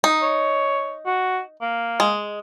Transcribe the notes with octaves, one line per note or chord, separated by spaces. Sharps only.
D#4
C#5
F#4
A#3
G#3